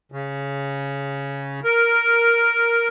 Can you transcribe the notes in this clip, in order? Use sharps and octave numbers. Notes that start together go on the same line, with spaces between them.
C#3
A#4